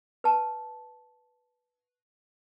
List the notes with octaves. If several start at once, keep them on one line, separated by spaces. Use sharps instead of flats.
B4 A5